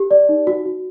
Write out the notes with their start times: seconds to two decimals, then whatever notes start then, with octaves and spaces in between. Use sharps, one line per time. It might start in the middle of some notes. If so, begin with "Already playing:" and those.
Already playing: G4
0.11 D5
0.29 D#4
0.47 F#4
0.66 F#4